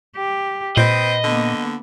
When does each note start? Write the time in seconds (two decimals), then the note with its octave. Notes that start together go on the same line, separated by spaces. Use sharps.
0.16 G4
0.77 A#2 C4 B4 D#5
1.24 D3 A#3 B3